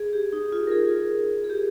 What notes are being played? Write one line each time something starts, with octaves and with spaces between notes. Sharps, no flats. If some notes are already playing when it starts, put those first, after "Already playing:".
Already playing: G#4
G4
D#4
F4
A#4
G#4
G#4
G4